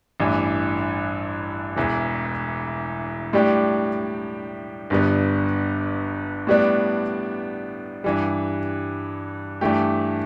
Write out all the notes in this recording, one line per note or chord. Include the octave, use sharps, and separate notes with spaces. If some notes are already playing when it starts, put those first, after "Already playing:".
A1 G2 E3
E1 E2 E3
A2 G3 D4 G4
G1 G2 G3 B3
A2 G3 B3 D4
G2 E3 G3
G2 E3 A3 G4